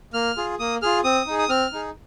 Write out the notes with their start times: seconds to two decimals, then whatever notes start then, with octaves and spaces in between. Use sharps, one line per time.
0.14 A#3 F6
0.37 F4 G#4
0.59 A#3 D#6
0.82 F4 G#4 F6
1.04 C4 D#6
1.26 D#4 G#4
1.39 D#6
1.49 C4 F6
1.73 D#4 G#4